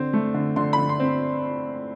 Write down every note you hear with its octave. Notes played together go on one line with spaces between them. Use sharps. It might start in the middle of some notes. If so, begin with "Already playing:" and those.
Already playing: D3 C4
A3
D3
D3 C6
D3 B5
C6
C4